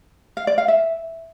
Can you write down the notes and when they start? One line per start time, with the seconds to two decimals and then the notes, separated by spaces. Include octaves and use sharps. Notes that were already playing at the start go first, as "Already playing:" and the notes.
0.37 F5
0.47 D5
0.58 F5
0.68 E5